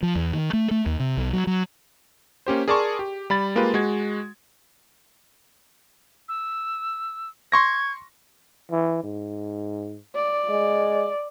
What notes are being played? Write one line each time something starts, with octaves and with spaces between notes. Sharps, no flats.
F3
E2
D#3
A3
A3
D#2
C3
B1
F#3
F#3
A#3 C#4 G4 C5
G#4 A#4 D5 A5 C6 C#6
G4
G3 B5 A6
G#3 A#3 F4 G4 B4
G#3 F#4 G#6
E6
C6 C#6 G#6 A#6
E3
G#2
D5
G#3